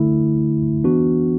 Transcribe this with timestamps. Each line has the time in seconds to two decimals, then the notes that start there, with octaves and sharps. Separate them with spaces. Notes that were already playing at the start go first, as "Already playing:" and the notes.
Already playing: D3 A3 E4
0.84 E3 B3 D4 F#4